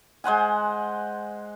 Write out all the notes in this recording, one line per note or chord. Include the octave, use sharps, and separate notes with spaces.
G#3 C5 F#5 G#5